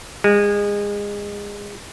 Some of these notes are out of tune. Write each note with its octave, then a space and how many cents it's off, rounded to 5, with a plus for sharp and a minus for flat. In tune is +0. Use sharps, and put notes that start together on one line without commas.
G#3 -25